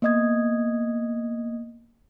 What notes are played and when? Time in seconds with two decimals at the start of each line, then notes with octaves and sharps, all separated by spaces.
0.02 A#3 B3 D#5 D#6 G#6